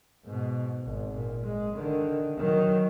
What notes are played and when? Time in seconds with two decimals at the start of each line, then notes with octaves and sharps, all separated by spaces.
0.25 G#2 B2
0.84 G#1
1.15 A#2
1.46 G#3
1.75 D3 D#3
2.38 D#3 F#3